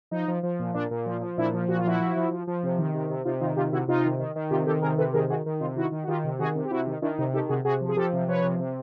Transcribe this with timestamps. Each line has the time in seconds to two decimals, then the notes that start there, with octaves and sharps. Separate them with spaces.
0.11 F3 D#4
0.28 F3
0.43 F3
0.59 A#2
0.74 A#2 D4
0.91 A#2
1.06 F3
1.21 F3
1.37 A#2 D4 E4
1.54 F3
1.68 A#2 F#4
1.78 F4
1.85 F3 E4 F#4
2.00 F3
2.16 F3
2.31 F3
2.47 F3
2.63 C3
2.79 D#3
2.94 C3
3.10 C3
3.25 C3 D#4 F4
3.41 D#3 D#4 F4
3.56 C3 F4 G4
3.72 C3 E4 F#4
3.88 C3 D#4 F4
4.05 D#3
4.19 D#3
4.36 D#3
4.51 C3 F4 G4
4.66 D#3 G4 A4
4.82 C3 G#4 A#4
4.98 C3 A4 B4
5.13 D#3 G#4 A#4
5.29 D#3 F#4 G#4
5.46 D#3
5.60 C3 D#4 F4
5.76 D#3 E4 F#4
5.92 D#3
6.03 F#4
6.07 D#3 F4 G4
6.24 C3
6.39 D#3 F#4 G#4
6.55 C3
6.65 G4
6.71 C3 E4 F#4
6.87 D#3
7.02 D#3 D4 E4
7.19 C3 D#4
7.33 D#3 G4 A4
7.49 C3 F#4 G#4
7.64 C3 F#4 G#4
7.81 F3
7.89 G#4
7.96 F3 G4 A4
8.13 C3
8.28 F3 B4 C#5
8.44 C3
8.59 C3